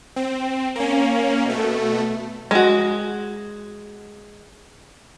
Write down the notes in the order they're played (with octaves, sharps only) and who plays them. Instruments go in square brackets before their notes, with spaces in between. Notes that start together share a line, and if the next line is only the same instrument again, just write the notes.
[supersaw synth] C4
A#3 C#4
B2 A3
[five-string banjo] G#3 F#4